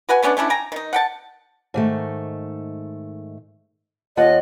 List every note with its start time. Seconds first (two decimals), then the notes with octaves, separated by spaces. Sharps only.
0.09 F#4 B4 F#5 G#5
0.23 A3 B3 C#4 D4
0.37 A3 C#4 D4 E4
0.50 G5 G#5 A#5
0.72 D#3 D#4
0.93 F#5 G5 A5
1.74 G#2 D#3 A3
4.17 D#2 F4 D#5 F#5